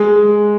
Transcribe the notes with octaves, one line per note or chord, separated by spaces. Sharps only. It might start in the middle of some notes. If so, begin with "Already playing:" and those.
Already playing: G#3